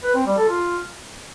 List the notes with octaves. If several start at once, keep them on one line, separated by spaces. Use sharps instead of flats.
B4
C4
G3
A4
F4